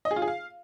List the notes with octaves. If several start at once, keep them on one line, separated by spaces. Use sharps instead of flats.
D#5
G#4
F4
G#4
F5